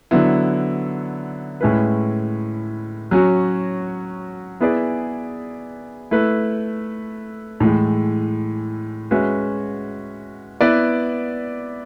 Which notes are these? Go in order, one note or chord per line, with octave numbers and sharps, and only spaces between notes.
D3 F#3 B3 E4
A2 G#3 C#4 E4 B4
F#3 C#4 F#4
B3 E4 G#4 B4 D5
A3 E4 B4
A2 E3 G#3
G#3 C#4 F#4 B4 E5
B3 E4 B4 D5